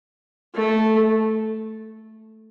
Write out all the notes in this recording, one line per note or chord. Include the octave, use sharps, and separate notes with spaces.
A3